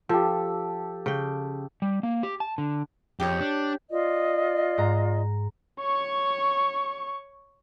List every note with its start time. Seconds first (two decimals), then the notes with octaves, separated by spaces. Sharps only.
0.09 F3 G4 A4
1.06 C#3 G5
1.82 G3
2.03 A#3
2.23 G4
2.40 A5
2.58 D3
3.20 F2 G4 C#5
3.40 D4
3.91 F4 D5 D#5
4.78 G#2 A#5
5.80 C#5 C#6